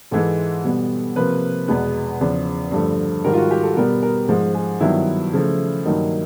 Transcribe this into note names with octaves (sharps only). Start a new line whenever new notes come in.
G#2 E3 G#3 A4
B2 G3 B3
C3 F3 A#3 B4
E2 B2 G#3 B3
E2 C#3 F3
G2 D3 F3 A3
G#2 D#3 G3 A#4
F4
F#4
G4
A4
B2 G3 B3 A#4
A#4
G#2 F3 G#3
G#4
G2 D#3 F#3 B3 E4
C#3 F3 A3
G2 D#3 F#3 A#3 D#4